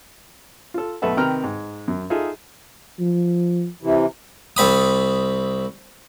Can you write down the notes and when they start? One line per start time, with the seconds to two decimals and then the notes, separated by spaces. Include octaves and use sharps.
0.74 F4 A4
1.02 B1 A3 A4 B4 E5 F#5
1.17 C3 D#3 B4 G5 A#5 F6
1.44 G#2
1.88 F#2
2.10 D#4 F4 G#4 A4 E5
3.00 F3
3.82 C3 E3
4.57 C2 C4 B5 D#6